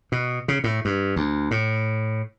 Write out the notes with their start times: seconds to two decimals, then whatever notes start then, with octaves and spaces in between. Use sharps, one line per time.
0.12 B2
0.48 C#3
0.64 A2
0.85 G2
1.16 D2
1.51 A2